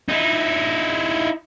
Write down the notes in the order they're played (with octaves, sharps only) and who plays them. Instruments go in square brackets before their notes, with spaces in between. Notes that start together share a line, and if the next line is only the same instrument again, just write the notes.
[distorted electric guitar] D#4 E4